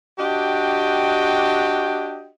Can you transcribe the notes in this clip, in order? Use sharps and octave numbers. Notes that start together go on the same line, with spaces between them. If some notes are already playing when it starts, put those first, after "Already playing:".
D4 F#4 G4 D#5 G5